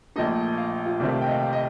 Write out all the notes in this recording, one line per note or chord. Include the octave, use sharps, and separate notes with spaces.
A#1 A#2 F3 A3 D#4 D#5
F5
F4
C2 C3 D#3 A3 C4 D5
F5
G5
D#5
F5
F5
D#5